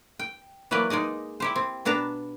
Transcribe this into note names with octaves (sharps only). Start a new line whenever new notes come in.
G5
E3 F#3 A#3 B4 D5
G#3 D#4 D5 D#5
E4 G4 C5
C4
B2 B3 D4 A5 A#5